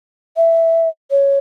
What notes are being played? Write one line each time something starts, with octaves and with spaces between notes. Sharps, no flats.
E5
C#5